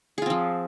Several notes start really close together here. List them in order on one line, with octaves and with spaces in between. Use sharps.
G#4 F4 C4 F3